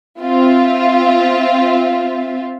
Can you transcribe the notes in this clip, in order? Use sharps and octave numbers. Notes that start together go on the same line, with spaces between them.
C4 F4 E5